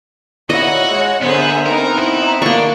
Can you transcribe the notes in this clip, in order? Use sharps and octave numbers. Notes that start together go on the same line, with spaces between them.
D#2 A#2 E4 F#4 C#5 D#5 F#5
G#3
D3 B3 G#4 A#4 C5 E5
A3 B3 C4 D#4 A#4
E4
A#3 D4 C#6